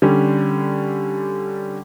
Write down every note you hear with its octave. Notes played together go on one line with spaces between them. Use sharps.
D3 G3 C#4